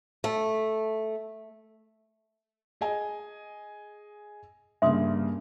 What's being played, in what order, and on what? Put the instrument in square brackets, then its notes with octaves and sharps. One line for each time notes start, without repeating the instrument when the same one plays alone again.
[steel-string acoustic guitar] A3
[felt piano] G#4 D#5 G#5
[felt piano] G2 C#3 A#3 [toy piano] E5 C6 D#6